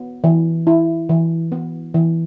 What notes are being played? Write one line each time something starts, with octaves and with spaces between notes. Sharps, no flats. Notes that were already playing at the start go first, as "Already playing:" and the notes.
Already playing: B3
E3
E4
E3
B3
E3